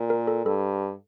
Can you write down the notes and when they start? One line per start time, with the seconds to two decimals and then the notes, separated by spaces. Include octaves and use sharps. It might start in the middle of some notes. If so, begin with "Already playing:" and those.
Already playing: A#2
0.10 A#4
0.27 A4
0.45 G2 A4